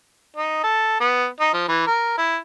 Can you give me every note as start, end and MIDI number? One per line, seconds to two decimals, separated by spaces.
0.37 0.59 63
0.64 1.00 69
1.00 1.26 59
1.40 1.53 63
1.53 1.66 53
1.68 1.82 52
1.87 2.15 70
2.18 2.37 64